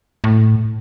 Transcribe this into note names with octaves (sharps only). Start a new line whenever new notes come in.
A2